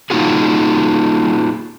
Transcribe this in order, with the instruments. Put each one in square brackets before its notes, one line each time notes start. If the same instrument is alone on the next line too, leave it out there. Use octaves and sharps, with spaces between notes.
[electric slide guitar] A#3 D#4 F4 F#4 G#4